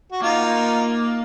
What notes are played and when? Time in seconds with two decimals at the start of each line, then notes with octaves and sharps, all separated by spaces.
0.12 F#4
0.22 A#3 D#4 F4